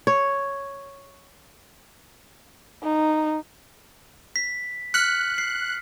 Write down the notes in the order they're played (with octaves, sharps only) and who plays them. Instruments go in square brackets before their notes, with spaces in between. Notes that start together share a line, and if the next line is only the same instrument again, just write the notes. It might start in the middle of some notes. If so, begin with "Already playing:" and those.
[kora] C#5
[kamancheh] D#4
[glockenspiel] B6
[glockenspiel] F6 B6 C#7 [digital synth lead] F#6
[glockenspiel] C7